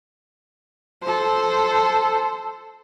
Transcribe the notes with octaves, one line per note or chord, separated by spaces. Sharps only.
A4 C5